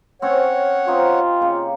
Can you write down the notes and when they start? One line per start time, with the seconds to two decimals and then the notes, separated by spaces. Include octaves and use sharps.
0.22 C4 C#4 C#5 F#5 G5
0.88 C4 D#4 F4 G4
1.41 C#3 A#3